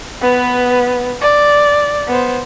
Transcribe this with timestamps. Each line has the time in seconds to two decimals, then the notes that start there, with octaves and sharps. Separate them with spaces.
0.21 B3 B4
1.21 D5
2.08 B3 C5